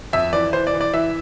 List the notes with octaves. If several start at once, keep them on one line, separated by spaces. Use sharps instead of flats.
F2 E5
E3 D5
E3 C5
D5
E3
D5
E3 E5